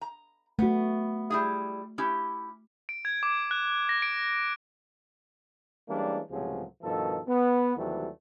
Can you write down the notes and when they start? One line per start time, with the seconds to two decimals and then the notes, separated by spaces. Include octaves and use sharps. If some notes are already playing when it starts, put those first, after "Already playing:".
0.01 A#5
0.59 A3 B3 F#4
1.30 G3 E4 G#4
1.98 C#4 E4 G4
2.89 D7
3.05 G#6
3.23 D6
3.51 F#6
3.89 A#6
4.02 D7
5.88 E3 G3 G#3 A#3 C#4 D4
6.31 C#2 A2 C3 F3 F#3 G#4
6.83 G2 B2 D#3 F3 A4
7.28 B3
7.77 D#2 C3 E3 F#3 G3 A3